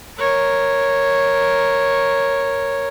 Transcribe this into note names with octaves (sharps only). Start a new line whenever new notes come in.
A#4 C#5